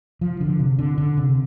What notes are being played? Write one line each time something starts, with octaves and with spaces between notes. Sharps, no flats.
F3
D3
C3
D3
D3
C3